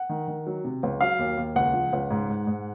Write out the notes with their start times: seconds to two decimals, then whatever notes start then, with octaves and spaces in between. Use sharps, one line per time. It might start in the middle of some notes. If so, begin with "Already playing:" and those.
Already playing: F#5
0.09 D#3
0.28 D#3
0.47 F#3
0.64 C3
0.83 C#2
1.01 F#3 F5
1.19 D#2
1.37 D#2
1.56 C#2 F#5
1.74 F3
1.93 C#2
2.11 G#2
2.30 G#2
2.47 G#2